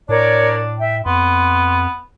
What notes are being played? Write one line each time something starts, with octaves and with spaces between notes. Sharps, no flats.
A2 D4 A#4 C#5 D5
E5 G5
F2 B3 C6